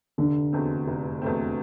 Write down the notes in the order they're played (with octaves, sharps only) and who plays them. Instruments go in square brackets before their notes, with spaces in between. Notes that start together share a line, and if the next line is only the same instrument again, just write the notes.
[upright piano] F1 [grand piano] D3
[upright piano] E2 B2 A3 C4
F1
E2 B2 A3 C4